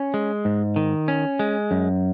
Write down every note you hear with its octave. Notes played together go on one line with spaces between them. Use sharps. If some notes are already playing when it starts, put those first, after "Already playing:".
Already playing: C#4
G#3
G#2
D#3
C#4
G#3
F#2